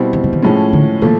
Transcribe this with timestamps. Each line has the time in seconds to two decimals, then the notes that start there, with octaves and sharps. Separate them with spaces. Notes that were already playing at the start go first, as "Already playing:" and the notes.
Already playing: B2 G3 C4 E4
0.13 D#3
0.24 C3
0.33 D#3
0.42 A2 F3 G#3 C#4
0.73 D3
1.02 A#2 D#3 F3 A3